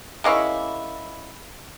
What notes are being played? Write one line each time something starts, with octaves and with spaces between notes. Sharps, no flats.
G#3 A#3 C#4 E4